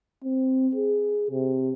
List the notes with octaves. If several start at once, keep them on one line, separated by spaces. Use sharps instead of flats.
C4
G#4
C3